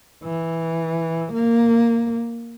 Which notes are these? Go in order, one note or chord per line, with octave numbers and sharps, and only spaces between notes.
E3
A#3